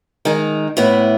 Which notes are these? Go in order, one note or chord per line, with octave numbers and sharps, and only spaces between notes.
D#3 G#3 D#4
A2 E3 B3 E4